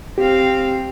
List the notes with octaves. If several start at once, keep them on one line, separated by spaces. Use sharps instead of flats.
C4 G4 F5